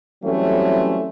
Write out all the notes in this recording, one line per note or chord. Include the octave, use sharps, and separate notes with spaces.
E3 F#3 G3 A3 C4 C#4